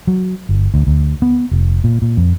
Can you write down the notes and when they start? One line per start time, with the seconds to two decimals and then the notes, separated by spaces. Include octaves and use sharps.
0.07 F#3
0.49 G1
0.74 D2
0.87 D2
1.22 B3
1.51 F1
1.84 A#2
2.02 A#2
2.17 F2